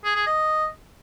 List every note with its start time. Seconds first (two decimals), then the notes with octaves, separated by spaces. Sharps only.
0.04 G#4
0.15 G#4
0.26 D#5